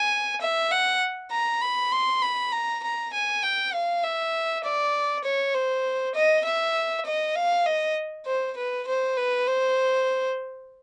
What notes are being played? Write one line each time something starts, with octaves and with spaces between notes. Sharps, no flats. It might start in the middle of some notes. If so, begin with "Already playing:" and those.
Already playing: G#5
E5
F#5
A#5
B5
C6
B5
A#5
A#5
G#5
G5
F5
E5
D5
C#5
C5
D#5
E5
D#5
F5
D#5
C5
B4
C5
B4
C5